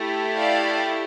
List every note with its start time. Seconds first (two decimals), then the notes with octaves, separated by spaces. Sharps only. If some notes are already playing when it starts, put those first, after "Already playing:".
Already playing: A3 E4 G4
0.36 D5 F5